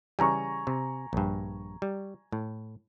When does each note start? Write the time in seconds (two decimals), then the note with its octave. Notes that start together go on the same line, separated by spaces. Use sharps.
0.19 C#3 E3 G3 G#5 A#5 C#6
0.67 C3
1.13 A#1 G2
1.82 G3
2.32 A2